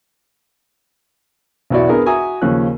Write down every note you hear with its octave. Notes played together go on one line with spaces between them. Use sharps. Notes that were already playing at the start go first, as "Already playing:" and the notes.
B1 E2 B3 E4 F#4 D5
B3 D4 G#4 A#4 B4
F#4 E5 G#5 A#5 D#6
D#2 C#3 F3 C#4 F#6